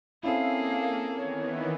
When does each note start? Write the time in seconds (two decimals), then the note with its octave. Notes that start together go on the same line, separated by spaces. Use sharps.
0.23 A#3 C4 C#4 E4 G#4 A4 F5
1.16 D#3 E3 B3 C#5